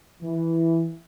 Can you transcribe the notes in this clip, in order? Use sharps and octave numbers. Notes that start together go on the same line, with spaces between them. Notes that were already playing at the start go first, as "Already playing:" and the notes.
E3